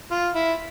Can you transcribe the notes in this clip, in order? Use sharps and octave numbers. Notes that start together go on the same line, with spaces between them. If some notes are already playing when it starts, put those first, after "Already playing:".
F4
E4